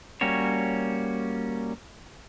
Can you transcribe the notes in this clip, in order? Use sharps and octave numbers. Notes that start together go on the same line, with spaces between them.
G3 A#3 C#4 F#4 C#5